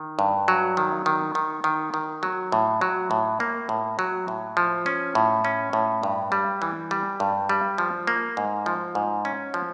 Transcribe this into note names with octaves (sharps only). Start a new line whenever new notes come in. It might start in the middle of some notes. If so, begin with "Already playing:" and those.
Already playing: D#3
G2
F#3
D#3
D#3
D#3
D#3
D#3
F#3
A2
F#3
A2
A#3
A2
F#3
A2
F3
C#4
A2
C#4
A2
G2
G3
E3
G3
G2
G3
F3
A#3
G#2
F3
G#2
C#4
F3